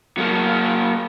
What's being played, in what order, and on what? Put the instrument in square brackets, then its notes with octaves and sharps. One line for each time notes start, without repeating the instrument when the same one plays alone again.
[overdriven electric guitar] F#3 A#3